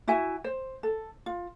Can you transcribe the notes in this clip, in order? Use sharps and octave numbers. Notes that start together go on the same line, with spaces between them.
E4 F#4 E5 G#5
C5
A4
F4